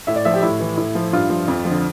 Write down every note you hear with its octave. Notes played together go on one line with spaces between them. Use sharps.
A2 E5
D5
F3 E5
G4
A2 E4
E3
A2
F3
G2 F4
F3
F2
D3 F3